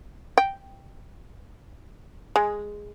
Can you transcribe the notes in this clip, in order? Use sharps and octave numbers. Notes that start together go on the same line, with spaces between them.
G5
G#3